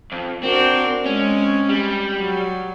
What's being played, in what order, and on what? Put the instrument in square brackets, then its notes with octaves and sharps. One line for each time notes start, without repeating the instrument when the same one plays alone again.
[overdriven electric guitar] F2
[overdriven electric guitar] C4 [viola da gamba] D4 F#4 A#4
[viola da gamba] G#3 C4 [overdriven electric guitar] C#4
[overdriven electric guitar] G3
[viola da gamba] F#3